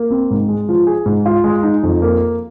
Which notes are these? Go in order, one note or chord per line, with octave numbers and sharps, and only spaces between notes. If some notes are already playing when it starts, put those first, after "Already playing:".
Already playing: A#3
C4
G#2
G#3
F3
G#4
G#2
F4
G#3
D#4
F2
A#3